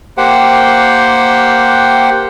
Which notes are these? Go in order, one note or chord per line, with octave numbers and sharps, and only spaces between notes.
A#3 G4 C5 F#5 G5